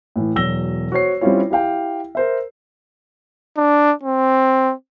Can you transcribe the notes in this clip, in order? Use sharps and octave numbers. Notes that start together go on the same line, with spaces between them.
A2 E3
E1 F#3 E6 A#6 G7
F#4 C5 C#5 C7
G3 C4 C#4 E4 F4 C#5
E4 G4 F5 G5
A#4 C5 E5
D4
C4